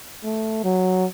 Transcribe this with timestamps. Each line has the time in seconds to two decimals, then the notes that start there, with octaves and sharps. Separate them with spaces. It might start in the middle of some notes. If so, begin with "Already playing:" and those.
0.24 A3
0.64 F#3